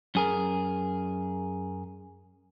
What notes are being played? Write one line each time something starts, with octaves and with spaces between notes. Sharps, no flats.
F#2 G#4 A#4